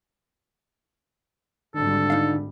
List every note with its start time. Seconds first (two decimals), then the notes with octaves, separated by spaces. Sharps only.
1.75 G#1 D3 G3 A4
2.10 D#4 F5